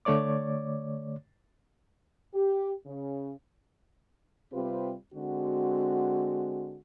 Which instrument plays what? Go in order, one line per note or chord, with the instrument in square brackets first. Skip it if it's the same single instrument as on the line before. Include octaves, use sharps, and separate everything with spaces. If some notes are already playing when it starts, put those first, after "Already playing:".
[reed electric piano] D3 A3 C#5 D5 D6
[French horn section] G4
C#3
C3 G3 C4 F4 G4 B4
D3 G#3 C4 F#4